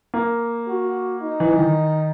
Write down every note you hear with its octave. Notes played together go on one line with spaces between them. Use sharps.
A#3
F#4
D#4
E3
E3
D#3